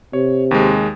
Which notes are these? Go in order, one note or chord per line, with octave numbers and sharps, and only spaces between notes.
C3 C#5
D#2 G#3